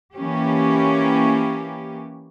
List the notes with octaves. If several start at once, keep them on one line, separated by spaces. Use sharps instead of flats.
E3 A#3 C#4 G4